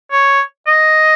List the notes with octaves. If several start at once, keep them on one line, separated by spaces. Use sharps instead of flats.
C#5
D#5